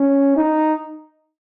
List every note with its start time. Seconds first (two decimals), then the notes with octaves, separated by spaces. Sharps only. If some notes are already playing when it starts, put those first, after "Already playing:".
Already playing: C#4
0.37 D#4